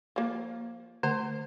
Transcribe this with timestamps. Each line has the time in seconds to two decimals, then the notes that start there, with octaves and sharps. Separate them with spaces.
0.16 F3 A#3
1.03 D3 A3 C5